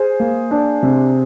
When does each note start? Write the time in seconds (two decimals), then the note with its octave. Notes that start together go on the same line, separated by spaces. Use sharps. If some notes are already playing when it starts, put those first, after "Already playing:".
Already playing: G#4 C5
0.20 A#3
0.51 D4
0.83 C3